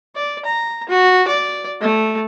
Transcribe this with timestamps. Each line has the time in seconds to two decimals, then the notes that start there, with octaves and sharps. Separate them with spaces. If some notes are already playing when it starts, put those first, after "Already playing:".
0.16 D5
0.45 A#5
0.89 F#4
1.27 D5
1.81 A3